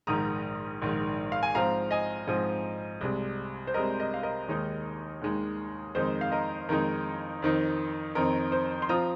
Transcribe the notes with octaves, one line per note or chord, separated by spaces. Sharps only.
A#1 G#2 D#3 A#5 D#6
A#1 G#2 D#3
F5
G#5
G#2 F3 C4 F5 A#5
D#5 G#5
G#2 F3 C4
C2 C3 G#3
C5
C2 C3 G#3 A#4 D#5
A#4 D#5
F5
A#4 D#5
D#2 D#3 G#3 D#4
D#2 D#3 G#3 D#4
F2 D#3 G#3 D#4 C5
F5
A#4 D#5
F2 D#3 G#3 D#4 A#4
F2 D#3 C4 D#4
F2 D#3 C4 D#4 A#4
C5
C6
F3 C4 F4 A#5 D#6